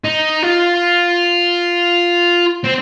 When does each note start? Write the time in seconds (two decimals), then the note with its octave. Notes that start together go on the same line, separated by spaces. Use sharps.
0.04 D#4
0.43 F4
2.64 C4